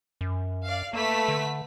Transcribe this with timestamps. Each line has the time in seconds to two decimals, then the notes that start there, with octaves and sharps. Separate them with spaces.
0.21 F#2
0.64 D5 F5
0.93 A3 A#3 B4 B6
1.28 D3